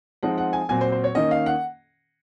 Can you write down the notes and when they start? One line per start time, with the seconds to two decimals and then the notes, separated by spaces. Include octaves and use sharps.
0.23 F3 G#3 C4 D#4 F#5
0.38 F#5
0.53 G#5
0.69 A#2 F#3 C4 G#5
0.81 C5
0.92 C5
1.04 C#5
1.15 D#3 A#3 C#4 D#5
1.31 F5
1.46 F#5